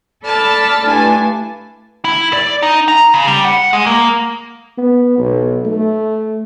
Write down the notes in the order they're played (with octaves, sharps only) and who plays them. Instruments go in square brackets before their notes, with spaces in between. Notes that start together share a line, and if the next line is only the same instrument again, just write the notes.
[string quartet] A4 D5 A5 B5 E6 F6
G2 A3 D4 E4 G#5 A5
[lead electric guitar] E4
D5
D#4
A#5
C#3
G3
F#5
G#3
A#3
[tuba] B3
B1
A3